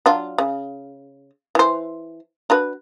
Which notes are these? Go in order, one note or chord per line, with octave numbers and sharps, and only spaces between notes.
F#3 D4 F4
C#3
E3 C5
D4 F#4 B4